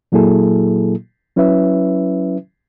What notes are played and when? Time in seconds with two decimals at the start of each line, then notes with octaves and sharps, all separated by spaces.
0.12 A#2 F#3 A#3 E4 G#4 A4
1.36 F#3 C#4 E4 B4 E5